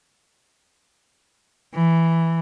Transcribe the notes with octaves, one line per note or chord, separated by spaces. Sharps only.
E3